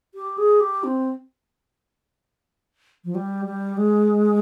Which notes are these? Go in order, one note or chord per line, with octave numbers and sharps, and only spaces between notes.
G4
G#4
G4
C4
F3
G3
G3
G#3